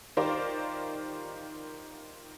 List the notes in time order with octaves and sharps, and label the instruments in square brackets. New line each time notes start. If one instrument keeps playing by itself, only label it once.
[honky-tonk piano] D#3 F4 G4 A#4 C5 D5